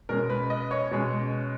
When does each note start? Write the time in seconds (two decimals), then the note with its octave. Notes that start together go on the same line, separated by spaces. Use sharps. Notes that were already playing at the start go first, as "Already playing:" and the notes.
0.09 B2 G#3 C#4 A#4
0.30 B4
0.50 D#5
0.71 C#5
0.91 B2 G#3 C#4